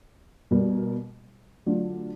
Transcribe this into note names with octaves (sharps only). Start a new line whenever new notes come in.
B2 G3 A#3
D3 F#3 A3 D4 F4